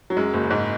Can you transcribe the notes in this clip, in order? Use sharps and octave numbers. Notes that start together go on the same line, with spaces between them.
F#3
F#2 G#3
F#1
G#2